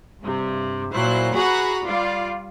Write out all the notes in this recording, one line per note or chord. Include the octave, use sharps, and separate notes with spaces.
G2 C3
A#2 F#3 E4 C5 F#6
F#4 G#4 B4 F#5 A#5 B5
G3 F4 D5